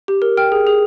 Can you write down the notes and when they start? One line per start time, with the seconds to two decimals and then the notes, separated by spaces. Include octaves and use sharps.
0.08 G4
0.22 A#4
0.37 G5 F6
0.52 G#4
0.67 G#4